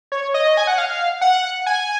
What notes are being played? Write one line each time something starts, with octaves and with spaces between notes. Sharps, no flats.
C#5
D#5
G#5
F#5
F5
F#5
G#5